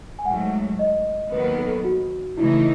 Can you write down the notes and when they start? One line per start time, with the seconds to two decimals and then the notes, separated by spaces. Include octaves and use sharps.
0.19 G#5
0.25 G#2 F#3 A3 F#5
0.79 D#5
1.32 D#2 D#3 F#3 B3 B4
1.45 B4
1.59 A4
1.84 F#4
2.37 C#3 E3 A3 D#4 E4